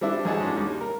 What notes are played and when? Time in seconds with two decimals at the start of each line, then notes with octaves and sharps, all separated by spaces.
0.01 G3 C4 D4 E4
0.25 F#2 E3 G#4 D#5 F#5 A5
0.41 G#3 C#4 D4
0.56 D#2 G3
0.81 A#4